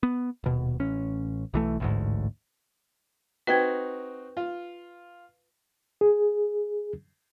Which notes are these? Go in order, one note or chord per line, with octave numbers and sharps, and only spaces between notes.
B3
D#1 B2
A1 C#4
B1 E3 A3
A1 D2 G#2
C4 D#4 F#4 B4 G5 G#6
F4
G#4